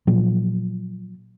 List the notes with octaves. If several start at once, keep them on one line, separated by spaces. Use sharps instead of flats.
A#2 F3 F#3